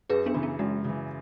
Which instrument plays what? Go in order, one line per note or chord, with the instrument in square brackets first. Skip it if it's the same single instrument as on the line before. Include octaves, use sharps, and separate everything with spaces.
[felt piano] F#2 [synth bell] G#4 B4
[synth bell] B3 D4
[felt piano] C#3 E3
[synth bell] B3
[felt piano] F#2 [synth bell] G#3
[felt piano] C#3 E3